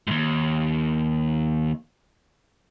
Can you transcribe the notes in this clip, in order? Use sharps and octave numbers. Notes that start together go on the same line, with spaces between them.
D#2 G#2